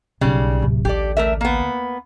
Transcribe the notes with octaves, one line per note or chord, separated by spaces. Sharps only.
B1 C#3 G3
D1 C3
A1 D2 G4 A4 D5
A3 A#4 E5
A#3 B3